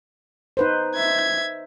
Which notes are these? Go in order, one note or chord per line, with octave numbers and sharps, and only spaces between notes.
D#4 B4 C5
E5 G#6